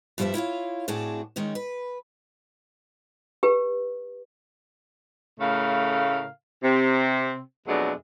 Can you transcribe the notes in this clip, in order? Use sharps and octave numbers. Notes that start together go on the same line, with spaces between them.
G2 F3 G3 G#4 C5 E5
E4 F4 C#5 F5
A2 C4 D4 F#4 G#4 A5
D#3 G#3 C#4 D#4
B4
G4 B4
A2 C#3 A3 A#4 F5
C3 C4
F2 B2 F#3 G#3 A3 D4